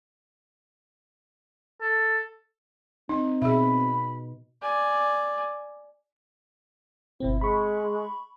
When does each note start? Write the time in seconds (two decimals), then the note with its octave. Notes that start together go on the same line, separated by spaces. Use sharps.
1.81 A4
3.09 C4 D4 D#4
3.42 B2 G#4 E5 B5
4.62 D5 G#5
7.20 G1 B2 C4 E4
7.41 G#3 B5 C#6